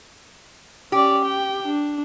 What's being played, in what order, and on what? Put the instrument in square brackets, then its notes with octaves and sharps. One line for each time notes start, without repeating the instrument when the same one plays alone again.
[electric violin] C#4 D5 [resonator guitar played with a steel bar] G4
[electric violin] G5
D4